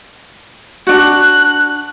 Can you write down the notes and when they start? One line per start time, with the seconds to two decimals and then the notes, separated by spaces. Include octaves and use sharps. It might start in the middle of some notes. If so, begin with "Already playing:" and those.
0.87 D4 F#4 F#6